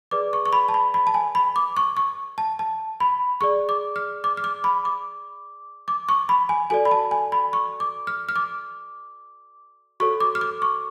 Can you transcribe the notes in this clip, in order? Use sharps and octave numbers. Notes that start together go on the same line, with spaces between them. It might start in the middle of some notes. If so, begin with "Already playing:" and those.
G#4 B4 D5 D6
C#6
C#6
B5
A5
B5
B5
A5
G#5
B5
D6
C#6
C#6
A5
A5
B5
G#4 D5 C#6
D6
F6
D6
F6
D6
B5
D6
D6
C#6
B5
G#5
F#4 A4 D5 G#5
B5
A5
G#5
B5
C#6
D6
F6
F6
D6
F#4 A4 C#5 C#6
D6
F6
D6
C#6